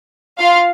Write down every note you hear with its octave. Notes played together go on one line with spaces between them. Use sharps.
F4 F5